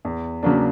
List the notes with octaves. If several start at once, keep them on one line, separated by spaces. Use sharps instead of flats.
E2
C#3 F#3 A#3 D4